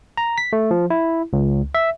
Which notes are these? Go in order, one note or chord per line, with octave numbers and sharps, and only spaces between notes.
A#5
B6
A3
F3
E4
C#2
E5